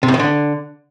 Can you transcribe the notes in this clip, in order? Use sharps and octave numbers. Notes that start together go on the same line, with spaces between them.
C3
A2
D#3
D3